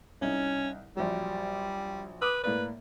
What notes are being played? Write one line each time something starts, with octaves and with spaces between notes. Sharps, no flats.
C2 C#4 D#4
A#1 F#3 G3
B4 D6 D#6
A2 A#3 B4 D5